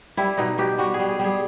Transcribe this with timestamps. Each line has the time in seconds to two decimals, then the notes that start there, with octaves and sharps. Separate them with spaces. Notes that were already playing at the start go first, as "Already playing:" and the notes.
0.17 G3 E4
0.37 B2 D#4
0.58 B2 G4
0.78 G3 F#4
0.94 G#4
0.99 G3
1.09 G#4
1.19 G3 G#4